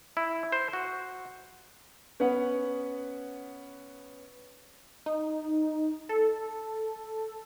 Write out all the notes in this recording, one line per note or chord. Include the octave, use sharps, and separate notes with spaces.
E4
C5
F#4
B3 C#4 B4 F#5
D#4
A4